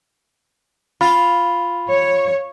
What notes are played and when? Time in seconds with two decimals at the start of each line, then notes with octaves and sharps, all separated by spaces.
1.01 F4 B5
1.90 C#5